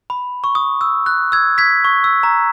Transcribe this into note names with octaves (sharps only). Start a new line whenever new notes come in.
B5
C#6
D#6
E6
F#6
E6 G#6
G#6 B6
C#6
E6
A#5